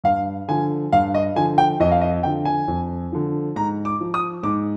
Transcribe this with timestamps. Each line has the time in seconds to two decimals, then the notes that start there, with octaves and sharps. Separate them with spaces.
0.04 G2 F5
0.48 D3 F3 G#5
0.92 G2 F5
1.14 D#5
1.36 D3 F3 G#5
1.58 G5
1.80 F2 D#5
1.91 F5
2.01 D#5
2.23 D3 F3 G5
2.45 G#5
2.68 F2
3.12 D3 F3
3.56 G#2 A#5
3.85 D6
4.00 F3
4.14 D#6
4.43 G#2 D6